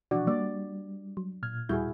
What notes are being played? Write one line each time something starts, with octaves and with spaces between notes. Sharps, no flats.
B2 E3 F3 D4 F#4 D5
G3 A#3 D5
F#3
A#2 F6 G#6
D#2 G3 E4 F#4 G#4 G6